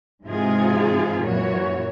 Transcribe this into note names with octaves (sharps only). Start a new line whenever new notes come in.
G#2 C3 E3 G#3 F4 G#4
F#2 A#2 E3 F#4 C#5